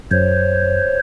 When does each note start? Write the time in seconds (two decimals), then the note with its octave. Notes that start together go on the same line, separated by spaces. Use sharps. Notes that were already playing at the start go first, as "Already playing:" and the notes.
0.11 F#2 C5 C#5